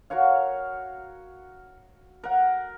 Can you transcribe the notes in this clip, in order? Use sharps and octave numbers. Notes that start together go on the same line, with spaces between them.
F#4 A#4 C#5 F5
A#4 F#5